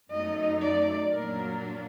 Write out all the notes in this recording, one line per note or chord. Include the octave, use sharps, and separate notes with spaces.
F#2 F#3 A3 D#4 D#5
D5
A#2 F#3 A#3 D4 A#4